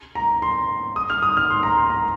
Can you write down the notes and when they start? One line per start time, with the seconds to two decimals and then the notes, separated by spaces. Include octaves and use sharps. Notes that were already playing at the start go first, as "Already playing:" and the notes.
0.15 A#5
0.42 C6
0.96 D#6
1.10 F6
1.22 D#6
1.37 F6
1.50 C6
1.63 A#5
1.77 C6
1.90 A#5